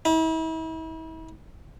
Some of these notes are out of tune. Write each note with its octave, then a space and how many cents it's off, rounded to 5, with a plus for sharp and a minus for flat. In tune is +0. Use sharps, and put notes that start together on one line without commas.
E4 -40